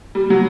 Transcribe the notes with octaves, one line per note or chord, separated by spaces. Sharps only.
G3
F#3